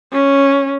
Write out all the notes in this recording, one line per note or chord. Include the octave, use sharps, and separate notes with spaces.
C#4